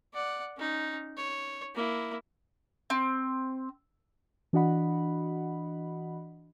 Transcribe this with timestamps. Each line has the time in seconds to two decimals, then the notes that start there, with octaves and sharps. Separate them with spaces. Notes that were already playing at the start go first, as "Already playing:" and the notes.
0.14 D5 F#5
0.57 C#4 D#4
1.17 C#5
1.74 A#3 E4
2.90 C4
4.53 E3 D4 F#4 D#5 F#5 B5